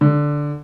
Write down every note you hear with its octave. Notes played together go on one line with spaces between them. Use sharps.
D3